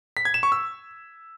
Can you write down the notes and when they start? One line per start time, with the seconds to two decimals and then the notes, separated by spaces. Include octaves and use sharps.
0.17 B6
0.25 G#6
0.34 E7
0.43 C#6
0.52 E6